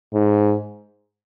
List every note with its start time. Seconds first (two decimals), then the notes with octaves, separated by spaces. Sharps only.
0.14 G#2